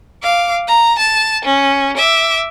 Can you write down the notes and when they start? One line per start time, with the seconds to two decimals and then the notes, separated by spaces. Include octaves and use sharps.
0.23 F5 D6
0.68 A#5
0.98 A5
1.45 C#4
1.97 E5 D6